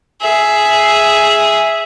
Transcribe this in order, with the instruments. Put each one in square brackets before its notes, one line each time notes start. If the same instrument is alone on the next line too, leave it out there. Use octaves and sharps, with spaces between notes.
[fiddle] G#4 E5